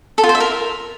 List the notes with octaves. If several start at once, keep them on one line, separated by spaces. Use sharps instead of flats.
A4
F4
C5
E5
A#4